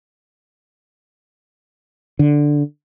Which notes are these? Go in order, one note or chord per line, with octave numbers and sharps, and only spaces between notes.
D3